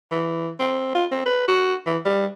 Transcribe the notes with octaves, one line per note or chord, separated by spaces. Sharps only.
E3
C4
F4
C4
B4
F#4
E3
G3